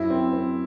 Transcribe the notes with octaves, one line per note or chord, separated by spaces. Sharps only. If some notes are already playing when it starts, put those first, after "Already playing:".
Already playing: F#2 E4
C4
C4